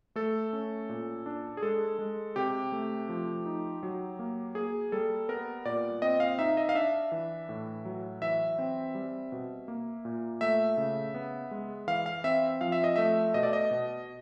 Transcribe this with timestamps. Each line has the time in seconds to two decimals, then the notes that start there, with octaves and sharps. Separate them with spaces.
0.16 A3 A4
0.53 C#4
0.89 A#2
1.26 D4
1.57 G#4
1.62 G#3 A4
1.99 G#3
2.36 C3 G4
2.72 A3
3.09 F3
3.46 D#4
3.83 F#3
4.19 A#3
4.55 A#3 G#4
4.92 G3 A4
5.29 B3 A#4
5.65 A#2 D5
6.02 C4 D#5
6.20 F5
6.39 D#4 E5
6.57 D#5
6.69 F5
6.75 D4 E5
7.12 E3
7.49 A2
7.85 F#3
8.22 E3 E5
8.58 C4
8.95 G3
9.32 B2
9.68 A#3
10.05 A#2
10.41 A3 E5
10.77 C#3
11.14 B3
11.51 G#3
11.88 E3 F5
12.06 F5
12.24 C4 E5
12.61 F3 F5
12.72 E5
12.84 D#5
12.96 A3 E5
13.34 B2 D#5
13.43 D5
13.53 D#5
13.71 B2